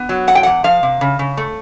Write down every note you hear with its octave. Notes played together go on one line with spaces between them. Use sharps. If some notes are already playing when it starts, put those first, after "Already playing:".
Already playing: B3
F#3
E2 F#5
G5
E2 F#5
F3 F5
C3
C#3
C#3
A3